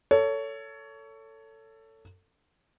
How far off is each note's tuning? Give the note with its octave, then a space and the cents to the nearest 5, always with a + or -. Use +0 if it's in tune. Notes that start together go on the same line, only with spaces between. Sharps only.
A4 +20 C#5 +20